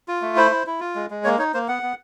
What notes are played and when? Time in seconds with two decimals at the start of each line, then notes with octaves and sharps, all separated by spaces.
0.08 F4
0.22 A3
0.36 E4 C5
0.51 E4
0.67 E4
0.80 F4
0.95 G#3
1.10 G#3
1.24 A#3 C#5
1.38 D#4 C#5
1.54 A#3 C5
1.68 B3 F#5
1.83 B3